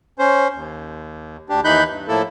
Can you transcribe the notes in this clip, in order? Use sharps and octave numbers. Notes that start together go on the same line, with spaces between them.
C#4 C5
D#2
D2 D4 G4
D#2 E3 D#4 B5 F#6 G6
G2
A2 F3 A#3 E4 A4